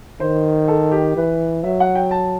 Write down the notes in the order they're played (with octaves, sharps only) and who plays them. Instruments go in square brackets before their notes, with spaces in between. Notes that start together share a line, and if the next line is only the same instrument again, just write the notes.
[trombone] D#3 [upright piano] C5
[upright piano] A4
G4
[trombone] E3 [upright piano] B4
[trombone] F#3 [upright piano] E5
[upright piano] F#5
G5
A5